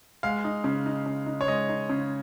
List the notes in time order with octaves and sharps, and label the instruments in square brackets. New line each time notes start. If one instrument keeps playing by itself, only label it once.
[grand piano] G#3 F5
D#4
C#3
D#4
C#3
D#4
C#5
G#3 D#5
D#4
C#3